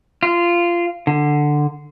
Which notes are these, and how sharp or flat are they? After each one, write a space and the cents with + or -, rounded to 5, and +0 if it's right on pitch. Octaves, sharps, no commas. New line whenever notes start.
F4 -15
D3 +10